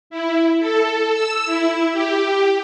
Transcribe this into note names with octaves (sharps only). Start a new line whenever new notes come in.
E4
A4
E6
E4
G4